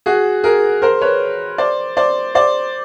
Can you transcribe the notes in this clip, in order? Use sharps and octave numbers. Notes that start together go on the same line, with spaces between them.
F#4 G#4
G#4 A#4
A#4 C5
B4 C#5
C5 D5
C5 D5
C5 D5